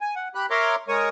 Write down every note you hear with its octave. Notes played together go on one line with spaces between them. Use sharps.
G#5
F#5
G4 B5 F#6
A#4 C#5 E5 A#5 C6 D6
G#3 A#4 C#5 C#6 D#6